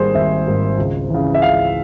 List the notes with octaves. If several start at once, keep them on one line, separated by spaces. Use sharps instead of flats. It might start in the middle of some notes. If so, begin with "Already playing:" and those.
Already playing: G#1 G#2 G3 A#3 G#4 C5
G#1 E5
G#2 G3 A#3
C#2
C#3 E3
E5
C#2 F5